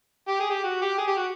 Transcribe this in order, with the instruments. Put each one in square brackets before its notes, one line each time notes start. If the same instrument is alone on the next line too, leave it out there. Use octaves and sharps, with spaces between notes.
[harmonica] G4
G#4
G4
F#4
G4
G#4
G4
F#4